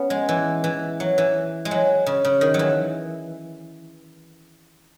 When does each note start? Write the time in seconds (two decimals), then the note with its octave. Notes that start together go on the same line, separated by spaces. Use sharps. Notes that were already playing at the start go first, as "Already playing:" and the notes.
Already playing: B3 C#4
0.10 G#3
0.29 E3
0.64 E3
1.00 F#3
1.18 E3
1.65 G#3
1.71 F#3
2.06 C#3
2.25 C#3
2.41 D#3
2.54 F#3
2.59 E3